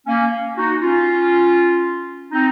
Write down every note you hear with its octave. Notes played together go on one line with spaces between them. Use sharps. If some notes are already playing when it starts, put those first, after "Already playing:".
A#3 C#4
D#4 F#4
C#4 F4
C4 D#4